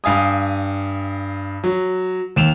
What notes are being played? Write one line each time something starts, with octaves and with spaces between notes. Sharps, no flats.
G2 F5 G#5 D#6
F#3
D#2 E7 F7